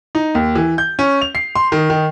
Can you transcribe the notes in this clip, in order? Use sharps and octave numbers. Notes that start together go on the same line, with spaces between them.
D#4
D#2
E3
G6
C#4
F7
C7
C6
D#3
D#3